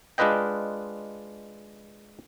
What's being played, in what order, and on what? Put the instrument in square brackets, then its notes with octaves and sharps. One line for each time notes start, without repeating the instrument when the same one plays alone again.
[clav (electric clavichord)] G#3 D4 F4 B4 D#5 G5